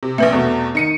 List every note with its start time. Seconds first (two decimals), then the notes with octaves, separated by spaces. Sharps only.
0.03 C3
0.18 A#1 A#2 C4 B4 E5
0.32 E2 B2 A3
0.75 D#3 C#7 D#7